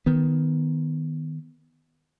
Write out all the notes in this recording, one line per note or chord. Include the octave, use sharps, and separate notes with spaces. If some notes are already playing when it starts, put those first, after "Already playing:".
D#3 B3